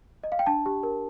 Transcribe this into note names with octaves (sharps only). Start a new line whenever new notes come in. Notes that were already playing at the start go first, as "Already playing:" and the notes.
D#5
F5
G5
D4 A5
G4
A#4